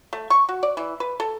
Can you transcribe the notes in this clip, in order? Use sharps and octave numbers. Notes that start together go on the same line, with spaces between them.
A3
C#6
F#4
D5
E3
B4
A4